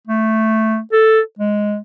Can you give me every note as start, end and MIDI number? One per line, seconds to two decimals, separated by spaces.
0.07 0.79 57
0.92 1.21 69
1.39 1.79 56